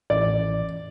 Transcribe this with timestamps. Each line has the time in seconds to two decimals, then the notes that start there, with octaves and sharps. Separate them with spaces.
0.10 A1 D5